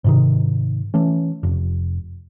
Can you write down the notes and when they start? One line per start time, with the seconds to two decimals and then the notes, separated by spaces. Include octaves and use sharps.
0.04 G#2 C3 D#3
0.94 E3 A3 C#4
1.43 F1